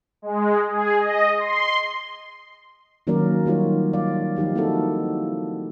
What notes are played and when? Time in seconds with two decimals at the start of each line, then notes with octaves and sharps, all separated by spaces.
0.22 G#3
0.68 G#4
0.99 D#5
1.39 C6
3.07 D#3 F#3 A#3 C#4 A#4 D5
3.46 F#3 G3 D#4 F4 A#4 C#5
3.93 D5 F5
4.36 F3 D#4 G4 F5
4.55 A#3 C4 D#4 E4 F#4 A4